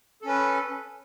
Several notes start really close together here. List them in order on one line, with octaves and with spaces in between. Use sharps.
A4 C#4 B4